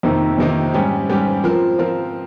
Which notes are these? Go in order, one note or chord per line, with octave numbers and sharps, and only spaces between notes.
F2 C3 D#3 A#3 D#4
F2 C3 D#3 A#3 D#4
G#2 G3 C#4 G4
G#2 G3 C#4 G4
F3 C4 F4 A#4
F3 C4 F4 A#4